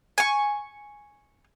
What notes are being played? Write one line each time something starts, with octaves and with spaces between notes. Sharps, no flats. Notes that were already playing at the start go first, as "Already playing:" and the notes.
G#5 C#6